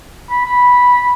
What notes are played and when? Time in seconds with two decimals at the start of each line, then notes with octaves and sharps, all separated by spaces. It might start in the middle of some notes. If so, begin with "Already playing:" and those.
0.30 B5
0.46 B5